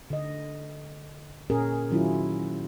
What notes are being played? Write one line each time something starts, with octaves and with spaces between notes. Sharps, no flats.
D3 D#5
A#2 C#4 G#4 A#4
D#3 F#3 C#4 E4 F4